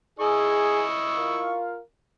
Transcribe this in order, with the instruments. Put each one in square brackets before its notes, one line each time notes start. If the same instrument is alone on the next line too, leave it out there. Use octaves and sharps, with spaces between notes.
[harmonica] E4 D#5 C#6 [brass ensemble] G#4
[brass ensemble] F4 A#4 F5